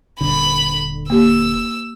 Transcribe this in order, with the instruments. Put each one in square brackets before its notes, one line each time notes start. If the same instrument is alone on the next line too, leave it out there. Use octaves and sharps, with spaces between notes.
[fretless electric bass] D#1 D3 [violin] B5
[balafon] A#3 G4 [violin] E6